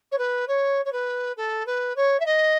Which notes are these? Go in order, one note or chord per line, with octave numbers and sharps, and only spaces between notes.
C#5
B4
C#5
C#5
B4
A4
B4
C#5
E5
D#5